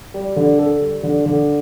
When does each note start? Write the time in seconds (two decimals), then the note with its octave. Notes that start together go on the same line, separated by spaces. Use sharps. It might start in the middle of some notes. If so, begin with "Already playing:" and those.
0.14 G3
0.36 D3
0.59 A4
0.81 G3
1.03 D3
1.26 D3